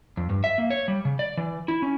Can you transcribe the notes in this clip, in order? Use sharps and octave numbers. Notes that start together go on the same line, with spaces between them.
F2
G2
E5
A#3
C#5
G3
C#3
D5
E3
E4
C#4